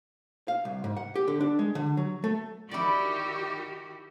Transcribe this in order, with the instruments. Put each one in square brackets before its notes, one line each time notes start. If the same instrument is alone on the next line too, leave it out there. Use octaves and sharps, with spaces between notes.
[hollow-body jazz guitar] F5
C2
G#2
F#5
G4
D3
D4
G#3
D3
F#3
A3
[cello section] D#3 F#4 G4 [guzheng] E4 D5